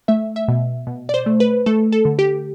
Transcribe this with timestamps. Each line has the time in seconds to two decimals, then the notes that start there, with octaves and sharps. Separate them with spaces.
0.08 A3 E5
0.36 E5
0.48 B2
0.87 B2
1.09 D5
1.14 C5
1.26 A3
1.40 B4
1.66 A3 A4
1.92 A4
2.05 D3
2.19 G4